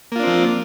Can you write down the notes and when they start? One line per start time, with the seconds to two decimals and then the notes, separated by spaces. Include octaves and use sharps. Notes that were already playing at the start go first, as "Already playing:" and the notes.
0.12 A#3
0.16 F4
0.19 D4
0.23 C4
0.27 F3